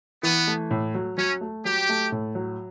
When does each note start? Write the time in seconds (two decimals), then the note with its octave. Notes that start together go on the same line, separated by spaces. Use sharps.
0.23 E3 B3
0.47 A3
0.71 A2
0.95 F#3
1.17 F#3 C#4
1.41 A3
1.65 F#3 G4
1.89 A3
2.12 A2
2.35 F#3